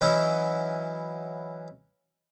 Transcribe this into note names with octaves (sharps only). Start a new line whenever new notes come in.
E3 F#3 C#4 D#4 E4